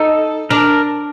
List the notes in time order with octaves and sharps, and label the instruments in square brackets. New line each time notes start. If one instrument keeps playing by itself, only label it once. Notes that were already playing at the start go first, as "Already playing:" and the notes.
Already playing: [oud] D#4 [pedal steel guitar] A4
[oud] D4 [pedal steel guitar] A#4